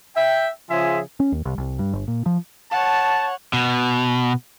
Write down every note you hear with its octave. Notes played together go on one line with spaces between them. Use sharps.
E5 G5
C#3 F3 F4 G#4 E5 G#5
C#4
D#2
C2
C2
G2
G1
A#2
F3
C#5 F#5 A5
B2